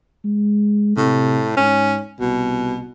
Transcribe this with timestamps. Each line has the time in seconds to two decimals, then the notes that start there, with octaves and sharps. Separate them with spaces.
0.24 G#3
0.97 A2 C3
1.57 G#2 C#4
2.20 C2 B2